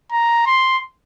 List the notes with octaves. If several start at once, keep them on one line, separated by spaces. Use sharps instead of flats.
A#5
C6